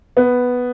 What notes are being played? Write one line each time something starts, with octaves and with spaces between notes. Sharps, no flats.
B3